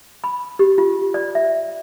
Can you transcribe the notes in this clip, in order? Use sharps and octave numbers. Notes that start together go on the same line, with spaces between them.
B5
G4
F4
D5
E5